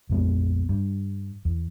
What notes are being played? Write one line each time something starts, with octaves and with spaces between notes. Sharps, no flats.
A#1 F2 G#3 B3
G2
E2